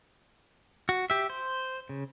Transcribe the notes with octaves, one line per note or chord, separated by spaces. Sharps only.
F#4
G4 E5
C5
C#3